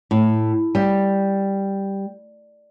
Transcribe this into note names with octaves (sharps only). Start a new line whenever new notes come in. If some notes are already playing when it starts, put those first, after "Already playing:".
A2
G3